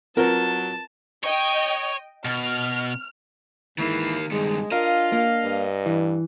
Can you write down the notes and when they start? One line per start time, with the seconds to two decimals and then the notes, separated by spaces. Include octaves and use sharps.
0.17 F#3 C4 F4 A#4 B4 A5
1.24 C#5 D#5 G5
2.25 B2 F6
3.78 G#2 D#3 E3 A#3
4.31 G2 D#3 G#3
4.72 D4 F4 A#4 D#5 F5
5.12 A#3
5.45 G2
5.86 E3